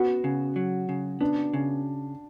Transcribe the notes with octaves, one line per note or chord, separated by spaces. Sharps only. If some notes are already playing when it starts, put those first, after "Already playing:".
Already playing: B3 F#4
C#3
F#3
C#3
B3 D4
C#3